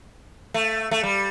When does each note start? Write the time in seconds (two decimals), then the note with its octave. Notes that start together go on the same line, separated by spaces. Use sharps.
0.54 A3
0.91 A3
1.03 G3